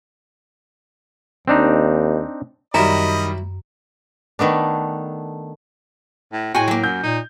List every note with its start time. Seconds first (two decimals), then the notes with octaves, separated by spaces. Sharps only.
1.48 D#2 C4 D4 D#4
2.74 F#2 D#3 F#3 G3 E4 D#5 B5
4.39 D#3 A3 B3 D4
6.33 A2
6.54 A2 G#3 F#4 G5 G#5
6.68 F#3 A#3
6.84 F#2 G6
7.04 A#2 D#4